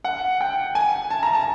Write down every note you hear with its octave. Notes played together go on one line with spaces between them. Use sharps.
F#5
G5
G#5
A5
A#5
A5